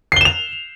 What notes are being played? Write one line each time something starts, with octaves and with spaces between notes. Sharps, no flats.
C7 E7 F7 G7